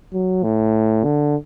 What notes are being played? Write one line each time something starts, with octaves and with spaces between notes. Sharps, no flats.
F#3
A2
D3